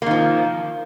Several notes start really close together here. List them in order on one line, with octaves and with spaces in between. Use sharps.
A#3 D#3 F3